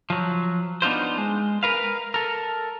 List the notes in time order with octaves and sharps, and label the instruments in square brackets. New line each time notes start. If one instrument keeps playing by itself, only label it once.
[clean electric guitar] F3 F#3
B3 D4 D#4 F4 C5
G#3
A#4 B4 F5
A4 A#4